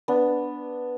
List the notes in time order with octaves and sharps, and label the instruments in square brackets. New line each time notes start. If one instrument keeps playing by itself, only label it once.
[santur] B3 D4